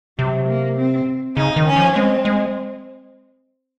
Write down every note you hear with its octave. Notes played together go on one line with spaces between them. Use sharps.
C3 F#3
A#3
C4
C#3 D#4
D#3
C#4
F3
G#3 C4
G#3